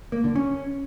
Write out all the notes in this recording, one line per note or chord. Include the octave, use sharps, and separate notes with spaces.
A#3
D3
C#4